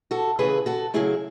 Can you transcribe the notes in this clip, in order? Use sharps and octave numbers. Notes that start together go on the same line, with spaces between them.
F#4 A4
C#3 E3 A3 G#4 B4
F#4 A4
C#3 F#3 A3 E4 G#4